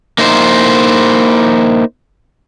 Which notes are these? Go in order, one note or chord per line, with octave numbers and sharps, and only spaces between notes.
A#3 D#4 E4 C5